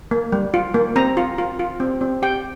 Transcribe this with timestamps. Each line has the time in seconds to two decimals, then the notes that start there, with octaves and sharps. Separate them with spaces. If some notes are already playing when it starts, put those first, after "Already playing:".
0.11 A#3
0.32 G3
0.54 F4
0.74 A#3
0.96 C4 A#5
1.17 F4
1.38 F4
1.59 F4
1.80 C4
2.01 C4
2.22 G4 G5